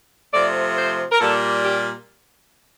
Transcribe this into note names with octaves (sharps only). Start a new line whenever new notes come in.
C3 F3 A3 D5
C5
A#4
A#2 G3 A#3 A4
G4